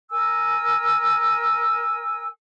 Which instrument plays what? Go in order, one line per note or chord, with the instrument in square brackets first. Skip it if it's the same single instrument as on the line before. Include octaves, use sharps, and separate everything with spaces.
[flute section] A#4 G#5 E6